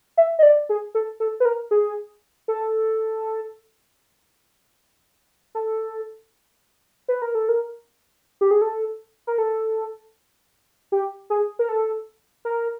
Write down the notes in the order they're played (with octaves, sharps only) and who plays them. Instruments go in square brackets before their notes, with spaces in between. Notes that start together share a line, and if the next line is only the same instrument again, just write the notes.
[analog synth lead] E5
D#5
D5
G#4
A4
A4
B4
A#4
G#4
A4
A4
B4
A#4
A4
A#4
G4
G#4
A4
A#4
A4
G4
G#4
A#4
A4
A#4